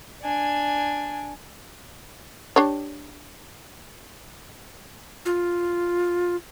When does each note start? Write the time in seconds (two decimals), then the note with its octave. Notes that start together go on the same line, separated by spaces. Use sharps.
0.23 D4 G#5
2.56 D4 G4 C#5
5.26 F4